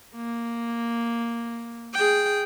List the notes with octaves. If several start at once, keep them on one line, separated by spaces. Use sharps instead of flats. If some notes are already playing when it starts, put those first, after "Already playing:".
A#3
G#4 G5